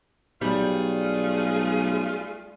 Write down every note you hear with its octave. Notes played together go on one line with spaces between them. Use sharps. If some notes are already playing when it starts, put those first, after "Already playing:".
B1 G3 A3 F4 G#4